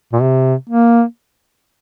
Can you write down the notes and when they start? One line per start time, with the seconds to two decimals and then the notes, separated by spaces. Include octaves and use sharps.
0.13 A#2
0.21 C3
0.69 A#3